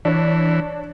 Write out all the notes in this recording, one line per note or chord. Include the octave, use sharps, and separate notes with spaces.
E3 D4 C#5